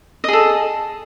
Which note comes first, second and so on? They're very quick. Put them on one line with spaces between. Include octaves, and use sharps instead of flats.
D#5 G#4 A4